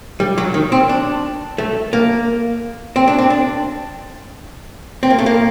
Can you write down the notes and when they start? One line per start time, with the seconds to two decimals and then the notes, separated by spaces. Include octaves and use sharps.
0.20 G3
0.38 F#3
0.54 D#3
0.72 C4
0.89 D4
1.58 A3
1.93 A#3
2.96 C4
3.07 D4
3.18 C4
3.30 D4
5.03 C4
5.10 A#3
5.18 A3
5.26 A#3